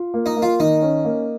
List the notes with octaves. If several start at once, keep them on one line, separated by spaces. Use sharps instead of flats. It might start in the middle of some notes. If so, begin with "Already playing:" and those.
Already playing: F4
A#3
D#4
A#3
F4
D#3 D#4
C#4
A#3